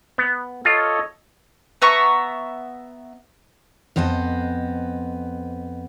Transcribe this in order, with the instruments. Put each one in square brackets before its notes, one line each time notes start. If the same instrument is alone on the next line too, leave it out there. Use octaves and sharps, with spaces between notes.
[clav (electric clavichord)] B3
[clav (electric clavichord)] F4 [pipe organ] A4 C#5 D#5
[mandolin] B3 E5 A#5 C#6
[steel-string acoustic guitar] F2 B3 C5 D#5 A5